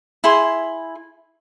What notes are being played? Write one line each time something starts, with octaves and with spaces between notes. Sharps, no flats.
E4 G#4 C6